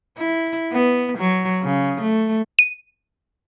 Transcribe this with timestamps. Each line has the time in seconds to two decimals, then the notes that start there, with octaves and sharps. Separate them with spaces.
0.18 E4
0.72 B3
1.18 F#3
1.62 C#3
2.01 A3
2.59 D#7